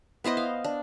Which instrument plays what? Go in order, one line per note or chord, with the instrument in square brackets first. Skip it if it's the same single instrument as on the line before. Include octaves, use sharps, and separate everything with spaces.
[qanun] B3 E4 C5 D#5
F5
D4